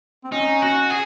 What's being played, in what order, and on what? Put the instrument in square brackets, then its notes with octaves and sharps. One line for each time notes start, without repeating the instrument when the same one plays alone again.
[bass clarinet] C4
[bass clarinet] C#4 [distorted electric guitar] D#4
[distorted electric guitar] F#4
G#4